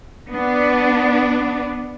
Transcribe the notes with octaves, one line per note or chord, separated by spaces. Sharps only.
B3 D4